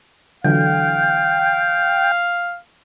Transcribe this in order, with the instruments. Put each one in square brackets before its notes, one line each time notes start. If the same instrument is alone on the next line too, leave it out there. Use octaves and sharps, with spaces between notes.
[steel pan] D3 E3 F#3 [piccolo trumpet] F5 [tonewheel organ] G5